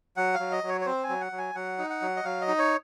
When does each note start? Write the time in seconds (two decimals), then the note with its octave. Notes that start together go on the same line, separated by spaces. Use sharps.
0.17 F#3 F#5
0.34 F5
0.40 F#3
0.52 D#5
0.64 F#3
0.69 C#5
0.81 C#5
0.86 C4 C5
1.04 G#5
1.09 F#3
1.21 F#5
1.32 F#3
1.38 G#5
1.55 F#3 F#5
1.79 D#4
1.90 F#5
2.02 F#3
2.17 D#5
2.24 F#3 F5
2.41 D#5
2.48 D#4
2.59 C#5